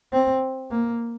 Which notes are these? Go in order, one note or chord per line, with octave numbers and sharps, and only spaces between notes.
C4
A#3